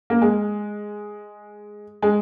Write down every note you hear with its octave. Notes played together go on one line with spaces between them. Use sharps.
A#3
G#3
G#3